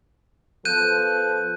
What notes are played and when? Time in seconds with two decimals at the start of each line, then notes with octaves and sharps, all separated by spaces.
0.65 F3 B3 A4 F#6 G6 D#7